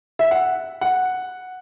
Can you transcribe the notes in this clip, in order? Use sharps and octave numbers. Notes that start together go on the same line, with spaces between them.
E5
F#5
F#5